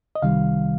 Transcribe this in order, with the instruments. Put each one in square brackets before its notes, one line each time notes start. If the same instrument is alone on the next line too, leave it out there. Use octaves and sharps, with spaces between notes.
[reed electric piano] D#5
C2 C3 D#3 G3 F5